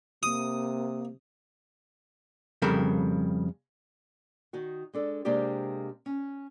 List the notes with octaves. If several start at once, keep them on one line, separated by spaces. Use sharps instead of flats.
C3 A#3 D#6
F2 C#3 G3 A4 A#4
D#3 D#4 F#4
G#3 D4 A4
C3 G#3 A#3 D4 G4 G#4
C#4